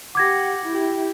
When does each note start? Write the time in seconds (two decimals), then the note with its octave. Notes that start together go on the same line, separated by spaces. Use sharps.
0.15 G4 F#5 D6 G#6 A#6
0.66 E4 G4